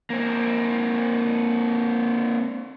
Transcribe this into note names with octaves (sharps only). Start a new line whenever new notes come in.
A#3 C4